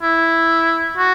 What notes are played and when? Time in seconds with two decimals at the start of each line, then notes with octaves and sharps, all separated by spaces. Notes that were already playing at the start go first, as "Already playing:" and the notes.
0.02 E4
0.97 F#4